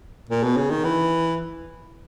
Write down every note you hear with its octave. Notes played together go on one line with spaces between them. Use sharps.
A#2
B2
C#3
D#3
E3